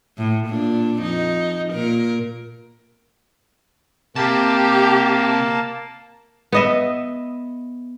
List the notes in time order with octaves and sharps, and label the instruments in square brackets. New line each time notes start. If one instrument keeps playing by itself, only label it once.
[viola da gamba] A2
A#2 D4
F2 D#4
A#2 A#4
[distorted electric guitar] C3 [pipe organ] A#3 [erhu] G4 [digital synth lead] A5
[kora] B3 D#5 E5